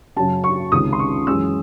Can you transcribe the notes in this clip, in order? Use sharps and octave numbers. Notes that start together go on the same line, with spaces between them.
F#2 C#3 F#3 C#4 A5
C#6
C#2 C3 D#3 G#3 C#4 D#6
C6
C#6
F#2 E3 G#3 C#4 E6